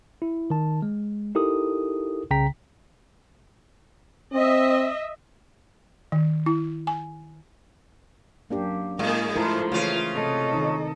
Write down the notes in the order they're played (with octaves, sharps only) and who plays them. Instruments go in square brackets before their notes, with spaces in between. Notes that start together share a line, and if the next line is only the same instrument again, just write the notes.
[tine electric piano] E4
D#3 A5
G#3
D#4 E4 G4 A4 A#4 D#6
C2 C#3 G5 A#5 B6
[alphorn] C4 [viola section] D#5 E5
[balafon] D#3
E4
G#5
[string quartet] F#2 [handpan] A#3 D4 G4
[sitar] A2 [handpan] G#3 [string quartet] A#3 G#4 D#5
[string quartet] F3 [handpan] A3 E4 A#4 [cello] A4 C5
[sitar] C#3 F4 [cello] E3 [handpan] A3
[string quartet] C3 [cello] A4 D#5
[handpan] D#3 D#4